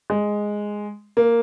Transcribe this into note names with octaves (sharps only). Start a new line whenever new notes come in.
G#3
A#3